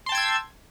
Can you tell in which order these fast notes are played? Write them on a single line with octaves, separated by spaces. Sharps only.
C6 A5 G5 G#6 E6